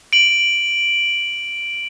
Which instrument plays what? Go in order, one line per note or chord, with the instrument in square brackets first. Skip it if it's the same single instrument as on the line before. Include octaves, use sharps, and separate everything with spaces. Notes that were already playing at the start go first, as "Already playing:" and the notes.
[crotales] D7 F#7